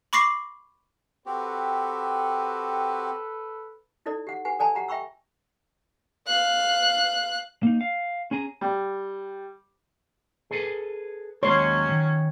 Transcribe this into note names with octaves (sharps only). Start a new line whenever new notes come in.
B5 C#6 D6 A#6 C7
C4 F#4 G4 A4 B4
D#4 E4 A4 D5
G4 F#5
G4 B4 F#5 G#5
A4 D5 G#5 A5 B5
G4 F#5 A#5 B5
E5 G5 B5 C#6 E6
F5 F#6
A#3 D#4
F5
C#4 G#4 G#5 A#5
G3
G#4 A4 B4
D#2 F#3 G#3 C#4 C#5 C6
D#3